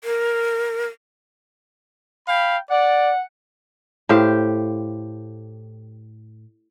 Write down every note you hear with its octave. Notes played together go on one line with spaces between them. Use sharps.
A#4
F5 G5 B5
D5 F#5
A2 G4 C5 F5